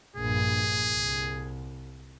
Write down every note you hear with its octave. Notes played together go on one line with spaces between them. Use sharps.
A#1 G2 G#4
C2